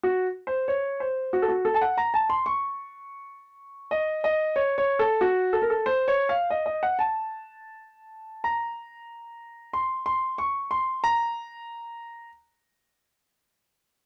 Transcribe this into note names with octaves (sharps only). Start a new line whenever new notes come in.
F#4
C5
C#5
C5
F#4
A4
F#4
A4
A5
F#5
A#5
A5
C6
C#6
D#5
D#5
C#5
C#5
A4
F#4
A4
A#4
A4
C5
C#5
F5
D#5
D#5
F#5
A5
A#5
C6
C6
C#6
C6
A#5